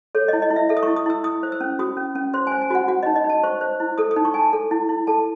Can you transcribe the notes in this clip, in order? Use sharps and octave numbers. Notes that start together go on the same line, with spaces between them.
A4 C#5
D#5
E4
D#5
E4
E5
A4 E5
D#6
E4 C#6
D#6
E4 E6
E4 D#6
C5
E6
C#4
F#4 D#6
C#4
C#4
C5 C6
C5 G#5
G#5
F#4 F#5
F#4 F#5
D#4 D#5
D#5
D#4
A5
C5 C#6
C5
E4
A4 D#6
D#6
D#4
C#6
D#4 G#5 A5
A4
E4
E4
A4 A5